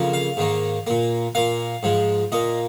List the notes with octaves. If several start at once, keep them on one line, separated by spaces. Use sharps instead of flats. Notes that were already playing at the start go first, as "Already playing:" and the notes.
Already playing: F2 C#3 F3 A#3
F5
G#2 D#3 A#3
A#2 A#3
A#2 A#3 F5
G#2 F3 G#3
A#2 A#3 D#5